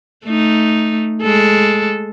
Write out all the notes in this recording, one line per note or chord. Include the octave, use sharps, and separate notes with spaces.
A3 D#4
G#3 A4